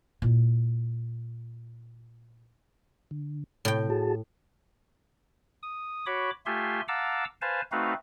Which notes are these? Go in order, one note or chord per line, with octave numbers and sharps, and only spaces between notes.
A#2 E4
D3
A2 C3 G5
F#4 G#4 A5
D#6
F#4 C#5 B5 D6
A3 F4 G4 E5 G#5 C6
F5 F#5 A5 A#5 D6 E6
B4 C5 F5 G#5 A5
A3 C4 D#4 F#4 B4 F5